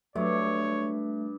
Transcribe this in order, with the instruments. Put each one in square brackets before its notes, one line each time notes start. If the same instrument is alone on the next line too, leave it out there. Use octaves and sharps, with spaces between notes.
[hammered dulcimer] G2 [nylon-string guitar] F#3 [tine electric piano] A3 [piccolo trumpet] C#5